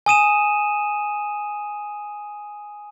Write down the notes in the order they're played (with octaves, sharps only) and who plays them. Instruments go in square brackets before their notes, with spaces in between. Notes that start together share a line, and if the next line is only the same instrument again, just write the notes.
[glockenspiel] G#5 D#6 D#7 E7